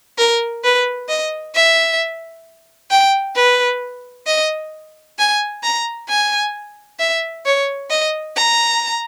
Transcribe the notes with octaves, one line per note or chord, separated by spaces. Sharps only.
A#4
B4
D#5
E5
G5
B4
D#5
G#5
A#5
G#5
E5
C#5
D#5
A#5